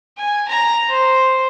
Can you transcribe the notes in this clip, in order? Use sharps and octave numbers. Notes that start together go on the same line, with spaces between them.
G#5
A#5
C5